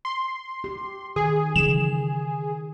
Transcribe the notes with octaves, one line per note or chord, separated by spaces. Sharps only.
C6
G4
D#3 G#4
C#3 E3 F#3 E7